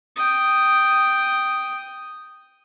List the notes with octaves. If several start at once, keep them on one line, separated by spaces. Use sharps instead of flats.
G5 D#6